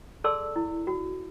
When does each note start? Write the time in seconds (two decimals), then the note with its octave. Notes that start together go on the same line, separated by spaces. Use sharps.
0.24 G#4 A4 D5 A5 C6 E6
0.56 E4
0.87 F#4